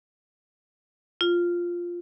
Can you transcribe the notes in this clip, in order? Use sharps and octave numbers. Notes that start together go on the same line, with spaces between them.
F4